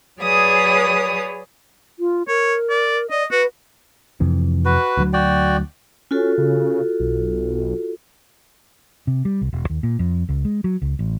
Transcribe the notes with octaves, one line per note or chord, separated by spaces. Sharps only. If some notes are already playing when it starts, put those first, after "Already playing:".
F#3 G#4 B4 C#5 D5 D#6
F4
A#4 C#5
D5
D5 D#5
F#4 B4
F2 C3 E3
F#4 B4
D2 F#3
F#4 D5 G5
C#4 F4 F#4 A4
C#3
B1
C3
G3
C2
E1
D#2
A#2
F2
C#2
G#3
F#3
C#2
A1